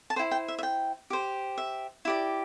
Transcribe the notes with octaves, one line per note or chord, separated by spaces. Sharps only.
A5
E4 C5 G5
G5
E5
E5
G5
G4 C5
E5
E4 G4 D5